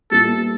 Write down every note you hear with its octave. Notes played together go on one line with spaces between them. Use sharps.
A#2 G3 B3 E4 A4